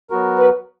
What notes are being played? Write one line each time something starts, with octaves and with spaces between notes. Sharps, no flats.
F#3 B3 F#4 A#4
B4